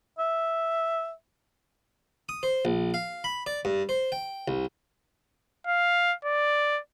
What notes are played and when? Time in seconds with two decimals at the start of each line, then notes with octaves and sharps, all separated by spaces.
0.19 E5
2.29 D#6
2.43 C5
2.65 A#1
2.94 F5
3.24 B5
3.46 D5
3.65 G2
3.89 C5
4.12 G5
4.48 C2
5.67 F5
6.25 D5